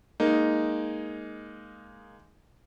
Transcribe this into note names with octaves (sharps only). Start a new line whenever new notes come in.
G#3 A#3 D#4